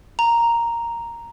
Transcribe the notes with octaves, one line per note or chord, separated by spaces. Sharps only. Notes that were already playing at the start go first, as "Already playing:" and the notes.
A#5